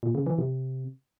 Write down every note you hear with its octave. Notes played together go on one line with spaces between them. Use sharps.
A#2
C#3
E3
C3